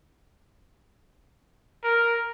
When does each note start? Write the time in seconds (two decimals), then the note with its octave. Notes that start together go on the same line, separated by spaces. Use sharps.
1.84 A#4